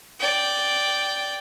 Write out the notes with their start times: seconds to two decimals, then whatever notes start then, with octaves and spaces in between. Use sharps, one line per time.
0.20 D5 G5